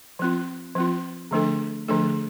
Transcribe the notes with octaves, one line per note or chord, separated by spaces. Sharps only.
F3 C4 F4
F3 C4 F4
D3 F3 A3 D4 A4
D3 F3 A3 D4 A4